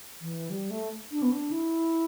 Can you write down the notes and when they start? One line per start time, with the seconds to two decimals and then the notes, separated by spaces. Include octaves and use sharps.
0.21 E3
0.50 G3
0.70 A3
1.12 D4
1.22 B3
1.31 D4
1.51 E4